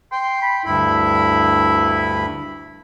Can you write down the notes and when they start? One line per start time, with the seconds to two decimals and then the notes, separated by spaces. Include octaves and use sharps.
0.12 G5 C6
0.42 B5
0.66 D2 G2 E4 B5